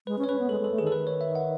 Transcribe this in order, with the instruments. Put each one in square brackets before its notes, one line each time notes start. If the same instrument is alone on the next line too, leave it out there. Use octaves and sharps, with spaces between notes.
[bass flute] G#3 [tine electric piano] B4
[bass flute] C#4
[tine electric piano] C#5
[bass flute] C#4 [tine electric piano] B4
[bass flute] B3
[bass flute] G#3 [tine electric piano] A4
[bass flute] G#3 [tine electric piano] A4
[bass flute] A3
[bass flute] D#3 [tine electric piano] G#4
[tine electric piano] A4
[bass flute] D#3 [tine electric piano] B4
[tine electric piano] C#5
E5
F#5